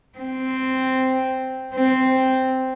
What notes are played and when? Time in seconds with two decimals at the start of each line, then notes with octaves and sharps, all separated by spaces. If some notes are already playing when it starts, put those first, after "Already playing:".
0.18 C4
1.75 C4